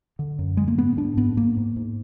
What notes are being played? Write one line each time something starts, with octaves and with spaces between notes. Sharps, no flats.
D3
F#2
D3 G#3
A#3
G#2 B3
G#2 D4
G#2 B3
G#2 A#3
G#2
G#2